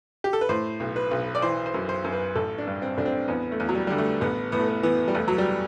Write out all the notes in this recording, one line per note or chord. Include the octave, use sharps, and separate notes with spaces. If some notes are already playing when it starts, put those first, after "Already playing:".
G4
A4
B4
A2 C5
B1
B4
B1
D5
E3 C5
C5
F#2
C5
F#2
B4
A1 A4
D4
G2
C4
A1 D4
C4
E2 B3
A3
E2
F#3
G3
D3 G3
A3
A1 B3
A2 B3
A3
B3
E3 B3
G3
E2 A3
F#3
G3